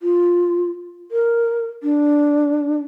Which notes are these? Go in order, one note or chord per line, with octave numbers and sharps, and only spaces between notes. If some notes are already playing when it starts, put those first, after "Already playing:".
F4
A#4
D4